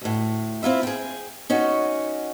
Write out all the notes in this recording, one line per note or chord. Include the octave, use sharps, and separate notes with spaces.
D2 A2
C4 E4 F4 E5
G#4 G5
C#4 D#4 F#4